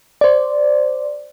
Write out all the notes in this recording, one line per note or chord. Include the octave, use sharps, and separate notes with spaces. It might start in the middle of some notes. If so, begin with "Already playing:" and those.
C5 D5